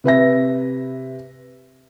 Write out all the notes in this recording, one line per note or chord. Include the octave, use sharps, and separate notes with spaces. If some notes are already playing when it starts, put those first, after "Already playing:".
C3 B4 E5 A#6